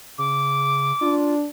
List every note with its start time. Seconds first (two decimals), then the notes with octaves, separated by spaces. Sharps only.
0.18 C#3 D6
1.01 D4 F4